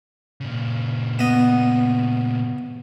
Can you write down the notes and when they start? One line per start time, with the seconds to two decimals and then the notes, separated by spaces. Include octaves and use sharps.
0.41 A#2 C#3
1.19 B3 D#5